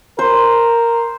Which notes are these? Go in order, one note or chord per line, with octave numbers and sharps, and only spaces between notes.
A#4 C5